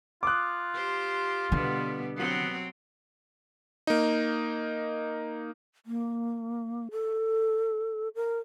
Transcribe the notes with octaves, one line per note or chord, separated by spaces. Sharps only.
F4 D6 D#6 F#6
G4 C5
B2 D3 G3 B3
F#3 B3 C4
A#3 D#4
A#3
A4
A#4